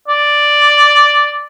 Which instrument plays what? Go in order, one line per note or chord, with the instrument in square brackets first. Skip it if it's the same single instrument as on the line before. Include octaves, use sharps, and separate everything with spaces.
[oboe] D5